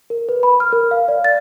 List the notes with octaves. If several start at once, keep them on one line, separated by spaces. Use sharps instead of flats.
A#4
B4
B5
F6
A#4
F5
D5
A6